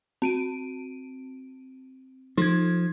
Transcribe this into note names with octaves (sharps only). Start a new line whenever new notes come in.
C4 D7 D#7
F3 D#4 G#6